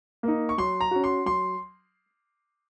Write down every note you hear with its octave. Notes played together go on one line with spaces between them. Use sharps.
A#3 D#4
C#6
F#3 C6
A#5
C#4 F#4
C6
F#3 C6